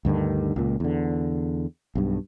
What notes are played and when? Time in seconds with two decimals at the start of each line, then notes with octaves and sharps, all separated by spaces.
0.05 D2 G2 D3 D#3
0.56 C#2 A#2
0.80 E2 D3
1.95 B1 G2